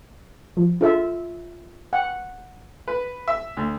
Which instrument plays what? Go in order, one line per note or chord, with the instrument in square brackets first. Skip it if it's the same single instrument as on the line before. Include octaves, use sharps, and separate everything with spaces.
[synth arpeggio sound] F3
[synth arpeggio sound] D4 G#4 A4 [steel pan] F4 E5
[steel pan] F#5 [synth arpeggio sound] G5
[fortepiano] B4
E5
D2